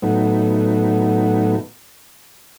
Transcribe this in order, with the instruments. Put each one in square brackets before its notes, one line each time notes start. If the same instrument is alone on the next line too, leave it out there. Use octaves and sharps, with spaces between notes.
[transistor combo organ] A2 F#3 A3 B3 D#4